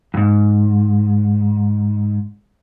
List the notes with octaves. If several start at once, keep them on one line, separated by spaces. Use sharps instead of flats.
F2 G#2